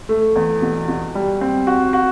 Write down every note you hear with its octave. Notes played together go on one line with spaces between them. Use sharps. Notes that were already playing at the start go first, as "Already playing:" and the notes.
A3
E2
B2
B2
G3
C4
F#4
F#4